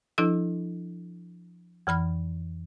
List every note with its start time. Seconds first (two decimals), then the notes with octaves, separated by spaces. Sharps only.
0.18 F3 D4 E4 A4 E6
1.87 F2 E3 B5 F6